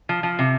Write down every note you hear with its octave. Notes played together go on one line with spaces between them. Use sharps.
F3
F3
C3